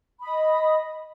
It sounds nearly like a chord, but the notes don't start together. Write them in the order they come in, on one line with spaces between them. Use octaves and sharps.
B5 D#6 D#5